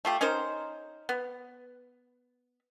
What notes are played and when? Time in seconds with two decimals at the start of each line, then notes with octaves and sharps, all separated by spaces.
0.05 A3 F4 G4
0.21 C#4 D#4 A#4 C5
1.09 B3